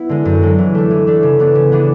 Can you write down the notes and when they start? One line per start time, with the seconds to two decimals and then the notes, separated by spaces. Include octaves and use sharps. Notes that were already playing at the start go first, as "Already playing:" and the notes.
Already playing: B3 E4
0.09 D3 G#3
0.25 F#2
0.42 D3 G#3
0.59 E3
0.75 A3 D4
0.90 E3
1.07 A3 D4
1.23 C#3
1.39 E3 B3 D4
1.55 C#3
1.72 E3 B3 D4